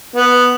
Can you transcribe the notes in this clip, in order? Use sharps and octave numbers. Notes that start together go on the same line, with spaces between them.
B3